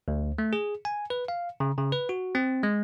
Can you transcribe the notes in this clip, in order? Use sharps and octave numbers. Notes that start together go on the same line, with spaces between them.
D2
A3
G#4
G#5
B4
F5
C#3
C#3
B4
F#4
C4
G#3